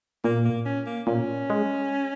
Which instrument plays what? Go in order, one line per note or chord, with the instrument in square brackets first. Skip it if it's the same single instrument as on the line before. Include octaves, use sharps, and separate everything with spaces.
[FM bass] A#2 [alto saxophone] A#3
[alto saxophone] A#3
C#4
A#3
[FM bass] A#2 [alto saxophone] C#4
[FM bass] G#3